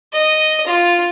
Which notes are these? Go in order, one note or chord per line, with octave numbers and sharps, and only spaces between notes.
D#5
F4